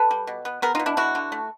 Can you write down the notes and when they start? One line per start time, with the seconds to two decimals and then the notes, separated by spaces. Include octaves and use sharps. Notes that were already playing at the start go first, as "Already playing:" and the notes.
Already playing: A4 B4
0.11 G3
0.27 B2
0.45 B3
0.62 B3 G#4 A#4
0.75 D#4 F4
0.80 B2
0.86 D4 E4
0.97 D3 E4 F#4
1.15 D3
1.32 A3